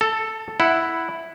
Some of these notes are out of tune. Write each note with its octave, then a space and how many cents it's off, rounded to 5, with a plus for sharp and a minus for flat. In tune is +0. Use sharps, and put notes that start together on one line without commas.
A4 +0 A5 +30
E4 +0 F#5 +0